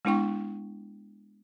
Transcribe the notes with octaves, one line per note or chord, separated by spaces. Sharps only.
G#3 B3 D4 E4 G5 C#6